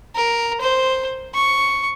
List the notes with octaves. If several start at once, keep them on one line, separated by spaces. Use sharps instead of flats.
A#4
C5
C#6